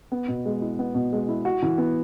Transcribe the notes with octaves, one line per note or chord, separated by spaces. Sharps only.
B3
B2
G#3
E4
B3
B2
G#3
E4
F#4
E3
B3